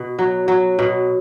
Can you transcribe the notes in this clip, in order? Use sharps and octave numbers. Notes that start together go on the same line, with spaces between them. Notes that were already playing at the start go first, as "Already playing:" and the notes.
Already playing: B2
F#3
F#3
B2